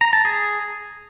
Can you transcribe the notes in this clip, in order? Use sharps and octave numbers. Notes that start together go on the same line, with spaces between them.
A#5
A5
G#4